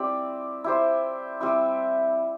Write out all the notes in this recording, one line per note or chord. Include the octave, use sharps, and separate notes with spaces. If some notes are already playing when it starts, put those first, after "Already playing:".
Already playing: G3 C4 E4 G4 D5
E4 G4 C5
G3 C4 E4